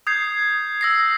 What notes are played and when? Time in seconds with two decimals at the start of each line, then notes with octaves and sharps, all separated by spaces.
0.07 D#6 G6 G#6 C7
0.81 E6 A#6 C7